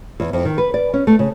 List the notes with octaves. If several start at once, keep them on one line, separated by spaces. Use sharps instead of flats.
E2
F2
D#3
B4
D5
C#4
A3
C#3